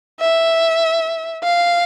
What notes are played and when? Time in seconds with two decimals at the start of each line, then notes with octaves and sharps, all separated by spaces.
0.21 E5
1.44 F5